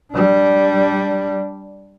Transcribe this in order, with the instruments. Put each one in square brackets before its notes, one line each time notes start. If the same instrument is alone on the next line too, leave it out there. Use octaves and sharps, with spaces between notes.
[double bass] G3 D4